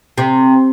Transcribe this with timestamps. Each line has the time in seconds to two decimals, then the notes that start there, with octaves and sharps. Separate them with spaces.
0.18 C3